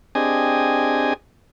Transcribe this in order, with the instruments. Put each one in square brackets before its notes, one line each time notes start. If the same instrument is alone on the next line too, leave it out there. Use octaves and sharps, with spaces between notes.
[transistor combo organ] C4 D4 G4 G#4 D#5 G#5